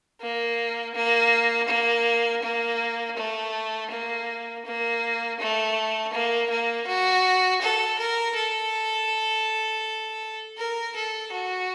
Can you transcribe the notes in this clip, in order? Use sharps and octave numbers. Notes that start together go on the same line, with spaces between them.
A#3
A#3
A#3
A#3
A3
A#3
A#3
A3
A#3
A#3
F#4
A4
A#4
A4
A#4
A4
F#4